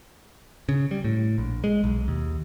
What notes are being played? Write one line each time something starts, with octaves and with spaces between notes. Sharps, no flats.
C#3
G3
A2
A#1
G#3
B1
D#2